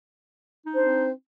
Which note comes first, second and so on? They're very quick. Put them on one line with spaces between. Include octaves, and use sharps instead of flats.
D#4 D4 C5 C4